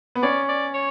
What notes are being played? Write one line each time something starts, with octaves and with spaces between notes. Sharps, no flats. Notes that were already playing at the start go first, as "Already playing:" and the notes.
B3
C#4 D5
D5
C#5